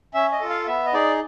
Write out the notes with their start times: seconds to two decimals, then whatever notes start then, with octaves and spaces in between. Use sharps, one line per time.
0.14 C#4 E5
0.32 D#5
0.41 F4 A4
0.50 F5
0.67 B3 E5
0.86 D#5
0.93 D#4 G#4 D5